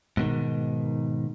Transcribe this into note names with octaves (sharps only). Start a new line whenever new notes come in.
G#2 B2 D#3